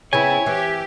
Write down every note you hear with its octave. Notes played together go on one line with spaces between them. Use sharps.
C#3 B3 C4 E4 C#5 G#5
E3 G4